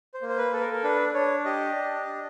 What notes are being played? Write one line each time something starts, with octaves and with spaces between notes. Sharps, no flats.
C5
A#3
C5
B4
A4 B4
A#4
A#4
D4 B4
D4 C#5
G4 D#5
D4
D4